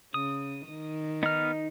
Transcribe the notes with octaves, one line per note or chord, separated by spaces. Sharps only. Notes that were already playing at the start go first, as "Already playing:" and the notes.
C#3 D#6
D#3
B3 D#4 F6